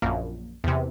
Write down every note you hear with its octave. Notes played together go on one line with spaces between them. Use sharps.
A#1 F#2 A#3
E2 C3